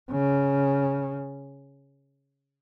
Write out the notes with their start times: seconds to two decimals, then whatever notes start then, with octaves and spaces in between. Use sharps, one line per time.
0.11 C#3